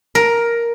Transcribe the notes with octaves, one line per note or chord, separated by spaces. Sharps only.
A#4